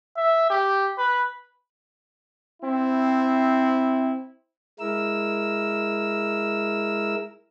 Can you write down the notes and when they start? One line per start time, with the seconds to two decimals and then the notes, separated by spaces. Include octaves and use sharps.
0.17 E5
0.50 G4
0.98 B4
2.63 C4 E4
4.80 G#3 E4 A#4 E6